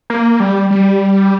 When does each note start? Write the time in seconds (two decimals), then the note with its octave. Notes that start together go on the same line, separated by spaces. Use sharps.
0.10 A#3
0.40 G3
0.71 G3